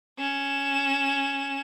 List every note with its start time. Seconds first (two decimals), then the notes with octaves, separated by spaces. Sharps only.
0.19 C#4 E7